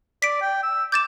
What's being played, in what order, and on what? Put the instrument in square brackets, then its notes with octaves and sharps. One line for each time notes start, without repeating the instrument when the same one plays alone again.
[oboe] D5 [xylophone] B6 D7
[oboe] G5
E6
[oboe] D6 [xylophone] G6 A6 E7